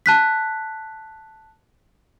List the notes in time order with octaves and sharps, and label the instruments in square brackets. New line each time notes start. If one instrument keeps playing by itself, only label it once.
[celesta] A5 F#6 B6